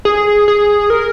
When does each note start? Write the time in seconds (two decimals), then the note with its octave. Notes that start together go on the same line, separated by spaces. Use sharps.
0.05 G#4
0.48 G#4
0.90 A#4